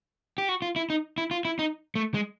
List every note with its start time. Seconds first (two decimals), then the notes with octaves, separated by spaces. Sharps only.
0.38 G4
0.49 F#4
0.62 F4
0.76 E4
0.90 D#4
1.18 E4
1.31 F4
1.45 E4
1.59 D#4
1.96 A3
2.14 G#3